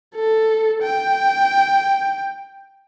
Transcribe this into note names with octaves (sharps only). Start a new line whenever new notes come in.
A4
G5